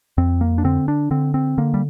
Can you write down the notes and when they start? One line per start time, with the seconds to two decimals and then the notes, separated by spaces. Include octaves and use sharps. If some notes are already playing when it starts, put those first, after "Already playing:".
0.18 F2 C4
0.41 A#3
0.58 D4
0.64 D3 C4
0.88 D4
1.11 D3 C4
1.34 C4
1.58 D3 A#3
1.74 G3